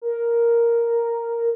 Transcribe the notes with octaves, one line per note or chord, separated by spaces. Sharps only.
A#4